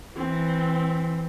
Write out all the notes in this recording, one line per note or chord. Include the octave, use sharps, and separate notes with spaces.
E3 C4